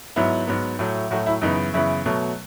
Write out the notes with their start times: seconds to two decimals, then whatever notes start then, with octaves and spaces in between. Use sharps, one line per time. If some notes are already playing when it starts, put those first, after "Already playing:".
0.16 G#2 F#3 B3 E4
0.48 G#2 F#3 B3
0.79 A2 F#3 A3
1.11 A2 F#3 A3 F#4
1.26 E4
1.42 F#2 C#3 E3 B3 D#4
1.74 F#2 C#3 E3 B3 E4
2.05 B2 F#3 A3